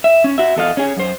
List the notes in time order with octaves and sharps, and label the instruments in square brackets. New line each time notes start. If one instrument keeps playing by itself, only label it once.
[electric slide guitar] E5
C#4
F#4 E5
E2 A4 D#5 F5
C#4 G#4
F#2 C5